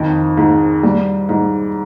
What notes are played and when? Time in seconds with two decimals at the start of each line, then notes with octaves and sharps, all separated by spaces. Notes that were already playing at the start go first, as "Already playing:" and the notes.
Already playing: F2 D#3
0.37 G#2
0.83 G3
1.29 G#2